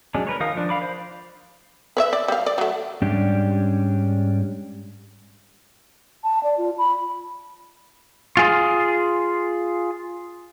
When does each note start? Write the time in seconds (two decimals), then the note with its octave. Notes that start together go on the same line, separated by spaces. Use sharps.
0.15 F#3 G#3 C#4 D4
0.27 A#4 B4 C#5
0.40 D#3 D#4 A#4 F5 D#6
0.55 F3 D4
0.69 F5 B5 D6
0.82 C5
1.97 B4 C#5 E5
2.13 D5
2.28 G3 F5
2.46 D5
2.58 F#3 A3
3.02 G#2 G3 C#4 D4 G4
6.24 A5
6.43 D5
6.58 F4
6.78 B5
8.37 F4 G#4